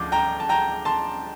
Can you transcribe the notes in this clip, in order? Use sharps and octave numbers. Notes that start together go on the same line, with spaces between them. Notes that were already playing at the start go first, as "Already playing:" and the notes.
Already playing: D2 F3 D6 G6
G5 A#5
A5
G5 A#5
A5 C6